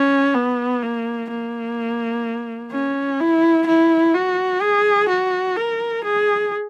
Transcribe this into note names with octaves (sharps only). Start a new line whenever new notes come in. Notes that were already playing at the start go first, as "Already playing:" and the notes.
Already playing: C#4
B3
A#3
A#3
C#4
E4
E4
F#4
G#4
F#4
A#4
G#4